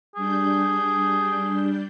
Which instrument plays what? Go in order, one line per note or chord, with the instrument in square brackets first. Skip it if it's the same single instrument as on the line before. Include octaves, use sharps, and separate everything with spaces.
[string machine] G3 D4 G6 [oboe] G#4